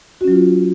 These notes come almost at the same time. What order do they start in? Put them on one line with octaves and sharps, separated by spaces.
F#4 C#4 F#3 F4